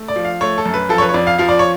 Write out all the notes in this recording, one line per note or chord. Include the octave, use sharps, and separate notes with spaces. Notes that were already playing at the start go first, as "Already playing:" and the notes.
Already playing: A3
D5
F3
F5
A3 C#5
A4
F#2
B4
F3 A4
C#5
B4
C#5
F2 D5
F5
F3 F5
D5
C#5